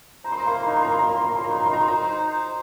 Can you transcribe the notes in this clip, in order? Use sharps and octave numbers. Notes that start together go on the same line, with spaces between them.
C5 A#5
C6
A#5
A#3 C6
A#5
C6
D#4 A#5
C6
A#3 A#5
C6
A#5
A#3 C6
A#5
C6
A#3 A#5
C6
A#5
D#4 C6
A#5
D#4 C6
A#5
C6
C5 A#5
D#4
C5